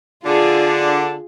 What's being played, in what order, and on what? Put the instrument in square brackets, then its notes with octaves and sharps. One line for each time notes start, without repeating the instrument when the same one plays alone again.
[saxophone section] D3 D4 [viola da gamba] F4 G#4